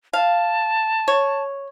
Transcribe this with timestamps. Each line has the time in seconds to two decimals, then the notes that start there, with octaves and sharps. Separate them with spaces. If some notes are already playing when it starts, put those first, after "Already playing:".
0.13 F5 A5
1.08 C#5